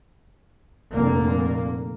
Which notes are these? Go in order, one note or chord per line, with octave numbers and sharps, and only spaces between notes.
F1 A#2 D3 A#3